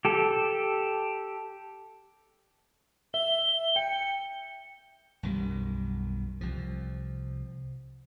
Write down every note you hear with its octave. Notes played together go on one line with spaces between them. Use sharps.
G4 A4
E5 G7
G5 C#7
B1 F#2 D#3 G3
C2 C3 F3